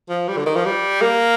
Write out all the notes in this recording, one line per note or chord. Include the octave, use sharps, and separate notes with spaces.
F3
G3
D3
D#3
F3
G3
A#3